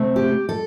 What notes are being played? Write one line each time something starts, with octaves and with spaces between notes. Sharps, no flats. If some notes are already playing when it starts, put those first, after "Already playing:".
Already playing: C3 A3 C4
G4
A4